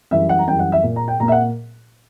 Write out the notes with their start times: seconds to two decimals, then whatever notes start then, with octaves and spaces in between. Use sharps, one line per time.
0.11 F#2 E3 G3 E5
0.29 F#5
0.39 A#5
0.47 F#2 E3 G3 G5
0.59 F#5
0.72 E5
0.83 A#2 A#3
0.96 A#5
1.08 G5
1.19 A#2 A#3 A#5
1.28 E5
1.32 F#5